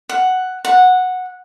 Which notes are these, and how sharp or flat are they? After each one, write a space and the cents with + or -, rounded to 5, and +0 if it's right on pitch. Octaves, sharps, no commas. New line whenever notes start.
F#5 +5
F#5 -10